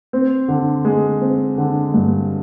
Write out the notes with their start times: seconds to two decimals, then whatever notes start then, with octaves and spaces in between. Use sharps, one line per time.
0.13 C4
0.48 D3
0.85 G#3
1.21 C4
1.58 D3
1.94 G2